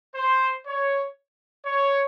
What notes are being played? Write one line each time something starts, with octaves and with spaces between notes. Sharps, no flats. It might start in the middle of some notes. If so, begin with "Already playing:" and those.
C5
C#5
C#5